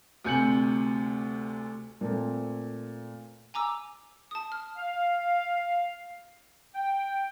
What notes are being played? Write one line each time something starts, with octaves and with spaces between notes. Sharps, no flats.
D2 C3 G#5 G6 C#7 F#7
A#2 A3 C4 A4
G#5 A#5 D6 E6
A5 D#6
F6
F5
G5